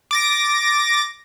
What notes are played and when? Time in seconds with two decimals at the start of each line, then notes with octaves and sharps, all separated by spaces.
0.11 D6 A6 A#6